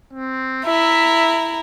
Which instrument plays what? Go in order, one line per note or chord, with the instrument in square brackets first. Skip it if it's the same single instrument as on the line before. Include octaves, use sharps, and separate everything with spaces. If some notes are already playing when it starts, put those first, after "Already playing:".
[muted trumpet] C4
[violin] E4 A#5 [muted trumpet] E5